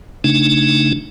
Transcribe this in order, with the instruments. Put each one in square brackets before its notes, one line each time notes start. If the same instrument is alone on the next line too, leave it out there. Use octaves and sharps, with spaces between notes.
[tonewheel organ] C#3 A3 D4 D#4